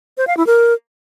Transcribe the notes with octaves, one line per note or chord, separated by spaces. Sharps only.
C5
F5
E4
A#4